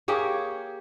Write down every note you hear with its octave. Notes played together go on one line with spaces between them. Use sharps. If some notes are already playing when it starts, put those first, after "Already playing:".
A#3 G4 G#4 C#5